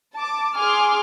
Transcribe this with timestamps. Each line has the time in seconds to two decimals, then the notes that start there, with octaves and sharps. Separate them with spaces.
0.16 A5 D6
0.56 G#4 G#5 C6 D6 F6